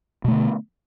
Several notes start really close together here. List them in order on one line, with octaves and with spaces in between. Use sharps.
B2 A3 D3 B3